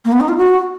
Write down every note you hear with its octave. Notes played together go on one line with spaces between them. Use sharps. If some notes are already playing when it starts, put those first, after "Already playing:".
A#3
B3
D#4
F4
F#4